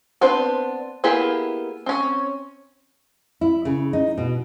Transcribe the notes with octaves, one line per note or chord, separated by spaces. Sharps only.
B3 C4 D4 B4 C5
A#3 B3 E4 G4 G#4
C4 C#4
E4
C#3
D#4
B2